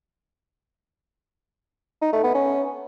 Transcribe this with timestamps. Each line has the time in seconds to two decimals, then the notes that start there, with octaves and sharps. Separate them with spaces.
2.02 D#4
2.13 A3
2.24 B3
2.35 C#4